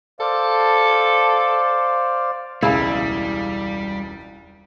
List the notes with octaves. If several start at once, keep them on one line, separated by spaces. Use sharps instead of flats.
A4 C5 D5 F5
E1 C#2 G3 E4 G#4 F5